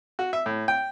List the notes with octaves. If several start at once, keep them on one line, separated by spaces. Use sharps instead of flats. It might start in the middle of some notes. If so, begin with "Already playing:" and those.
F#4
E5
A2
G5